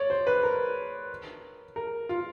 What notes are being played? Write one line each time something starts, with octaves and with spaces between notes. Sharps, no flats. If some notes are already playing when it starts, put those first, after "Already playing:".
Already playing: C#5 D5
C5
B4
A#4
A#4
F4